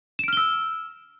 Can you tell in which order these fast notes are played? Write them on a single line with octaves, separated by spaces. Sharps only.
E7 D7 F6 G7 E6